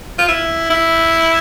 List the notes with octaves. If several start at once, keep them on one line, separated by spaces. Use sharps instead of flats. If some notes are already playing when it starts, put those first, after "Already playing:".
F4
E4
E4